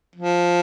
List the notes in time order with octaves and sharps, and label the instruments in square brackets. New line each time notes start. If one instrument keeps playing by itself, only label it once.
[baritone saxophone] F3